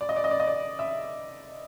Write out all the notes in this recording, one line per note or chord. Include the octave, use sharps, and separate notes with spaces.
D5
D#5
D5
D#5
D5
D#5
D5
E5